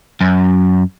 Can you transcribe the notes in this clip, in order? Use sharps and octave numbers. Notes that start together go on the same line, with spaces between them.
F#2